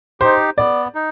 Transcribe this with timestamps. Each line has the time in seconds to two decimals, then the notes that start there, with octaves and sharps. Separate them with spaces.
0.20 D#4 G4 C5
0.58 B3 D5
0.95 D#4